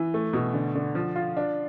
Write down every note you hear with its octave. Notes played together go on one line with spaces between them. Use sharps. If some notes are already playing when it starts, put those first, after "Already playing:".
Already playing: E3
A3
B2
D3
D3
F3
F4
D4